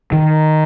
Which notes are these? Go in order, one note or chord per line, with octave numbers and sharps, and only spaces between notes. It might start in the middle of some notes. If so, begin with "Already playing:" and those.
D#3